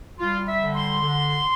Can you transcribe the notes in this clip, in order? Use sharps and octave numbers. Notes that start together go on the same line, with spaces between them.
G3 F4
E5
D3
C6
D3